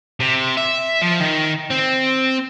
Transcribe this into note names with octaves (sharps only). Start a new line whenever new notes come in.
C3
E5
F3
D#3
C4